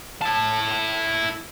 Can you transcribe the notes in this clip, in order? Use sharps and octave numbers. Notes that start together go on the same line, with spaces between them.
E4 A5